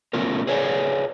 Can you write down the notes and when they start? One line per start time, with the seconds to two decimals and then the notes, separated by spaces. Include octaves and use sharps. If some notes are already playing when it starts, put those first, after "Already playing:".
0.13 A3 B3 C#4 F4 A#4
0.47 G#4 B4 C#5 D5 G#5